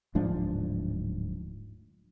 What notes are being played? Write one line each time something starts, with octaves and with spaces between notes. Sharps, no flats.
D1 G#2 F3 D4